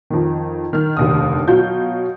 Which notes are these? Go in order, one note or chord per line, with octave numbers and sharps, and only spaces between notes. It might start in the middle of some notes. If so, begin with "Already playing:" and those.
F2 D#3
D#3 F6
F1 D#2 D3 D#6
B2 F#3 F4 G6